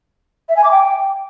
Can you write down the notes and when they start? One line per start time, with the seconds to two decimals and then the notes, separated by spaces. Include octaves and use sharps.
0.49 E5
0.56 G#5
0.64 D6
0.71 G5